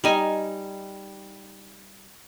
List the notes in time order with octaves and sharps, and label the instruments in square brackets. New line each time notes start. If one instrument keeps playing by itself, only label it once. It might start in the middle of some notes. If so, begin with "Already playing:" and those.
[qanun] G3 D#4 G#5